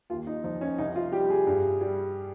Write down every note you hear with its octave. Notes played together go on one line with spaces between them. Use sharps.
D#2 F4
D#4
F3 D#4
C#4
C2 D#4
F4
G3 G4
G#4
G2
G3